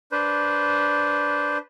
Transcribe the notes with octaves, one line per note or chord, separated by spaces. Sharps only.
D4 B4 C5